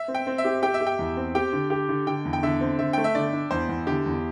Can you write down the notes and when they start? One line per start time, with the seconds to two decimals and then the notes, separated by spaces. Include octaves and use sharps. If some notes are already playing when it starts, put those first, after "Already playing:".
Already playing: E5
0.08 C4
0.15 G5
0.27 C4
0.38 E5
0.45 G4
0.62 G4 G5
0.74 E5
0.80 G4
0.87 G5
0.99 E2
1.17 C4
1.35 G4 G5
1.53 D3
1.70 G4
1.89 D3
2.07 D3 G5
2.25 E2
2.33 G5
2.43 D3 E5
2.61 C4
2.79 D3 E5
2.93 A3 G5
3.04 E5
3.15 D3 D5
3.33 D4
3.51 E2 C5
3.69 E2
3.87 D3 G4
4.06 E2